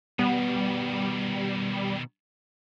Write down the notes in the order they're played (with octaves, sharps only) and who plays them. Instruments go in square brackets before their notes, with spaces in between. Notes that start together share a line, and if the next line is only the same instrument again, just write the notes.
[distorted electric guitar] B2 D#3 [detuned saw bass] G3 [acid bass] B3